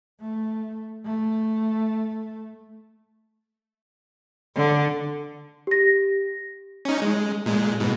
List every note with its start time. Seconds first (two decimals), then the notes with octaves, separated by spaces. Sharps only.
0.21 A3
1.05 A3
4.56 D3
5.67 G4 A#6
6.85 C#4 D#4
7.02 G#3
7.46 A#2 G#3
7.80 G#2 B2